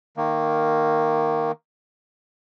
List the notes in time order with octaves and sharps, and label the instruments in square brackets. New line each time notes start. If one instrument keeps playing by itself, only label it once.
[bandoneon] D#3 A#3